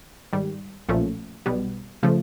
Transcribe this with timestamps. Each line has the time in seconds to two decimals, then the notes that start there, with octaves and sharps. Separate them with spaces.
0.33 G#2 D#3 G3
0.89 B1 A#2 F3 A3 C#4
1.46 B1 B2 G3 B3
2.03 C#3 F3 A3